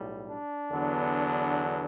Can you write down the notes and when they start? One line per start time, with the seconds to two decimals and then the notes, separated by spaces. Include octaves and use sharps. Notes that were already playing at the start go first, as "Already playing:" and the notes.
Already playing: B1 A2 G3
0.29 D4
0.70 E2 D3 F#3 B3